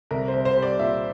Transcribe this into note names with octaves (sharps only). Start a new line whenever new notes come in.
C2 A#4
C5
C2
C5
G3
D5
A#2 E5